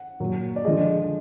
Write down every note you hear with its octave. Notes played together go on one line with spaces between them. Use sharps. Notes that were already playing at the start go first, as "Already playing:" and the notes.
Already playing: F#5
A#2 F#3
D5
D3 F3 G#3 D#5